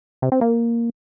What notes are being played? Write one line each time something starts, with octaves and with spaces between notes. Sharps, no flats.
C3
C4
A#3